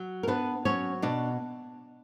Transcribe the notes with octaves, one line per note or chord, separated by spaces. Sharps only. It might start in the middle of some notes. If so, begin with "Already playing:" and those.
Already playing: F#3
A#4
B3 D4 B4
F#3 C#4 C#5
B2 D4 D5